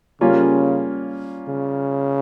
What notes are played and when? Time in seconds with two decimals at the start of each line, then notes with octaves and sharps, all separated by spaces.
0.21 C#3 G3 A#3 C#4 F4
1.48 C#3